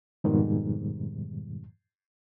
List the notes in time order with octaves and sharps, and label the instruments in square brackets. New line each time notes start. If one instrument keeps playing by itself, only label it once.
[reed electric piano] F2 G#2 B2 D#3 G3